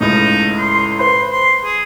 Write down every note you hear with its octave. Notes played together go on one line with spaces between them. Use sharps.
C#2 A2 D#4
C6
B4 C5 C6
C6
G#4